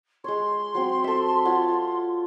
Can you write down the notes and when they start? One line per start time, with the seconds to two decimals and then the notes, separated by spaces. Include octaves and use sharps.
0.24 G#3 C#5 C6
0.75 F#3 C4
1.04 A4 E5
1.45 F4 C#5 F#5